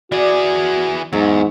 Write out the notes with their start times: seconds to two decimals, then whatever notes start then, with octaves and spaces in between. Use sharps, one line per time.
0.12 E3 F#4 G#4 D5
1.13 E2 G#2 F#3